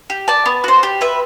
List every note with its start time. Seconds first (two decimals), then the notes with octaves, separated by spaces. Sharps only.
0.10 G4
0.28 D5 A5
0.46 B3
0.64 F#4 C5
0.83 G4
1.01 B4 E5